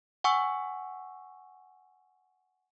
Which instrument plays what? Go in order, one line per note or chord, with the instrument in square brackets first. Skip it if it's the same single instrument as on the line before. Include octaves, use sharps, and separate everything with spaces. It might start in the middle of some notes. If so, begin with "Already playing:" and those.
[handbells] F#5 G#5 C#6 E6